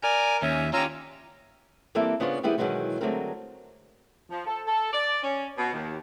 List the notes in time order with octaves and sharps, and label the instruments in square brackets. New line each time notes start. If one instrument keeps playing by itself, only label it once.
[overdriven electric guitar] A#4 [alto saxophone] D5 [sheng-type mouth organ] G#5
[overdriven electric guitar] D#2 [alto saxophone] C#4 [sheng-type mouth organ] E5
[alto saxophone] C#4 [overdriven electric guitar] F4 G4 [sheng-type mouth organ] A#5 E6
[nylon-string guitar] E3 G3 A#3 C4 A4 E5
C#3 B3 D4 F4 C5 C#5
D#3 G3 B3 E4 G4 G#4
B2 D#3 E3 F#3 G#3 B3
D3 F#3 G#3 A3 C4 A#4
[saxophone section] F3
A4
A4
D5
C#4
B2
D#2